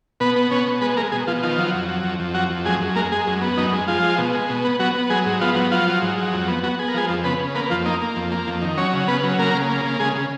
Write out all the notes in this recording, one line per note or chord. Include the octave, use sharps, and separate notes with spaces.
B2 B3 B4
B3
B2 C#4 C#5
B2
G#3 B3 B4
G#3 A#3 A#4
B2 G#3 G#4
B2 F3 F4
D#3 F3 F4
F#3
F2
F#3
F2
F2
F#3 F#4
F2
F#2 G#3 G#4
F#2
G#3 A#3 A#4
G#3 G#4
F#2
B3
F#2 D#4
G#3
F3 G#3 F4
G#3
B2
G#3
B2
B3
F#3 B3 F#4
B3
F#3 G#3 G#4
G#2
F3 B3 F4
F#3
F3 F#3 F4
F#3
G#2
F#3
F2
B3
F#3 B3 F#4
B3 G#4
A#4
F3 G#3 G#4
F2
C#3 B3 B4
C#3
A#3 B3 B4
F2 F3 F4
A#3 D#4
A#3
F2
A#3
F2
D#3
F#3 C#4 C#5
C#3
C#3 B3 B4
F#3
C#3 A#3 A#4
C#3
A#3
C#3
C#3 G#3 G#4
C#3